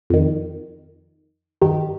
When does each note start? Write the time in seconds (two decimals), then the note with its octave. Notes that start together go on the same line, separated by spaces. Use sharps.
0.10 F2 D#3
1.62 G2 D#3 G4